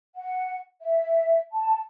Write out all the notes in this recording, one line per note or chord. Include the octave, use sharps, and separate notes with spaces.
F#5
E5
A5